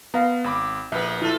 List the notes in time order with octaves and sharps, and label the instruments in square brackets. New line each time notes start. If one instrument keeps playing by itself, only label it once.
[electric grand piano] B3 [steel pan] F5 A#5
[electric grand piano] G#1 B5 D6
[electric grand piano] A#1 [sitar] A#3 B3 B4 [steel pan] E5
[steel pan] E4 [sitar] F4 A4